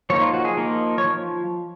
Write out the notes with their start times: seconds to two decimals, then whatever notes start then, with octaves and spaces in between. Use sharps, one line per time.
0.10 F3 A#3 D#4 C#5
0.21 F4
0.34 F#4
0.45 G#4
0.57 F3 A#3 D#4 A#4
0.98 C#5
1.04 F3